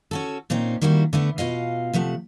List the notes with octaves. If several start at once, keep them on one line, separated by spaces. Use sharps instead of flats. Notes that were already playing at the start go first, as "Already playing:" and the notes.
C#4 F#4 A4
A#2 C4 C#4 D#4
D#3 G3 A#3 E4 F#4
D3 A3 B3
B2 F4 D#5 F5
C3 F3 A3 F#5